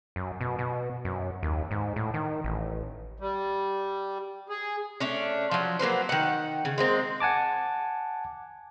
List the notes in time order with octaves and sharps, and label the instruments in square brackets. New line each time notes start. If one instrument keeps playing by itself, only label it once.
[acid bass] F#2
B2
B2
F#2
D#2
G#2
A2
D#3
A1
[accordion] G3
G#4
[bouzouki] A3 C#4 D4
F3 F#3
F#3 A#3 B3 C5
D#3 F#5
C#3
G#3 A#3 C4
[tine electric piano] F#5 G#5 A5 D6